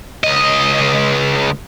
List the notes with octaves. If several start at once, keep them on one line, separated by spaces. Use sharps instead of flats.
C#2 D#5